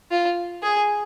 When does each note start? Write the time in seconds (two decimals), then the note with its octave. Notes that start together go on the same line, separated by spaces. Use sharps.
0.11 F4
0.63 G#4